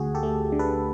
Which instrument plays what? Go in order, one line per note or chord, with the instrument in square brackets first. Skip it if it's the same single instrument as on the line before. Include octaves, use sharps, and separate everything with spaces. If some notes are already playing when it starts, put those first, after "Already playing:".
Already playing: [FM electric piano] D2 F#4 G#4
G4 A4
A3
D3
A4 B4